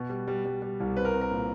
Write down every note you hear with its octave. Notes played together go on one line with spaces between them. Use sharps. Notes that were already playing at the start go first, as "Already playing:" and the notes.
Already playing: B2 B4
G3
G3
G3
G3
C2
C4 B4
A#4
C4
A#4
A#2